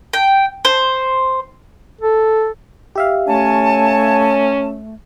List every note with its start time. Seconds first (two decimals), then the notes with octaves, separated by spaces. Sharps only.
0.13 G5
0.65 C5
2.01 A4
2.95 G4 E5 F5
3.28 A3 C#4 C#5 G#5 A5